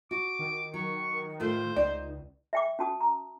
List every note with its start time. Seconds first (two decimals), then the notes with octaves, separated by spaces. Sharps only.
0.11 F#4 D6
0.39 D#3
0.74 F#3 C#6
1.40 A2 A3 F4 C5
1.77 C#2 D#4 D5
2.53 E5 G5 D6
2.79 C#4 F#4 A5 D#6
3.01 A#5